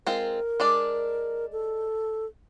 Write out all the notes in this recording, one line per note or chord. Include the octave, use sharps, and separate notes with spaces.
G#3 C4 F4 A#4
G#3 D4 D5
A4